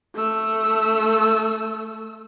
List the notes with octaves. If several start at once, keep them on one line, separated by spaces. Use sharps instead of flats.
A3 E6